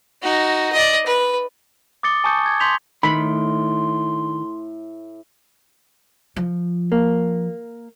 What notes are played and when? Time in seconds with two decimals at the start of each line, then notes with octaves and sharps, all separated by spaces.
0.22 D#4 F#4
0.73 D5 D#5
1.06 B4
2.03 D6 D#6 A6 C#7 G7
2.24 G#5 A5 C#6 D#6 G6 C#7
2.46 G#6
2.60 C6 G6 B6 F7 G7
3.03 A2 D#3 B5 C6
6.36 F3
6.92 A#3